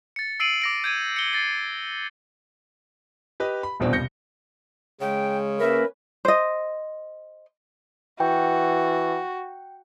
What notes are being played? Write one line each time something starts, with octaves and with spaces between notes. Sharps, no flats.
A6 C#7
E6 C7 D7 D#7 F#7
D6 A#6 D7
G6 G#6 D#7
C#7 G7
A6 C7
G4 B4 D#5
B5
D#1 E2 B2 C4 D4
C2 G6 A#6 C#7
C#3 G#3 G5
A#3 C#4 A#4 B4 E5
C5 D#5
E3 F#4 G5